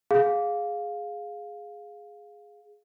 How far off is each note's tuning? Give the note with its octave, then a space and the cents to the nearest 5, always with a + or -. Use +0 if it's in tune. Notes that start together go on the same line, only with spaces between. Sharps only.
G#4 +0 F5 +10